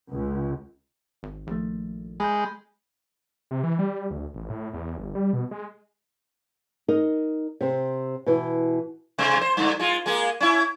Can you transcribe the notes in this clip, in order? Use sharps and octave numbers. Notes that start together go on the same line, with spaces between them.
C#2
G#1
A#1 D#3 F3 A3
G#3 B5 G6
C3
E3
G3
D2
A1
A2
E2
G1
G3
B2
G#3
D#4 A#4 D#5
C3 C4
B2 E3
C3 G#3 C5
C5
G2 D3
G#3 F4
G#3 A#3 G#4
C#4 E4